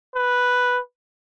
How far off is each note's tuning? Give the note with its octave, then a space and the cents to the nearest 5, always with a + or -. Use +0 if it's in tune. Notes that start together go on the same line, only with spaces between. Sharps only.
B4 +0